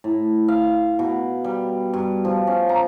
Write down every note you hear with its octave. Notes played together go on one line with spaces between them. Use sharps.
A2
F5
B2
G3
G2
F3
C#4
A#5